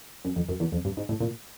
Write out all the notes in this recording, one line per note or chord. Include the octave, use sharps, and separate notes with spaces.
F#2
F2
F#2
E2
F2
G2
G#2
A2
A#2